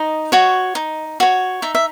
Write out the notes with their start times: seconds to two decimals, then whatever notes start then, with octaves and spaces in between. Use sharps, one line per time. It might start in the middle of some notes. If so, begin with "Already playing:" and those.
Already playing: D#4 D#5
0.32 F#4 C#5
0.75 D#4
1.20 F#4 C#5
1.62 D#4 E5
1.75 E5